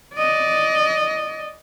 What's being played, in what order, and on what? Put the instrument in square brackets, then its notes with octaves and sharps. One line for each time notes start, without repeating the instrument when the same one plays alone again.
[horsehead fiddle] D5 D#5